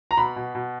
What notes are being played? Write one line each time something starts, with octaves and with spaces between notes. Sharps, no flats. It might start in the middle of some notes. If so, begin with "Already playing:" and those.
A#5
B2 B5
B2
B2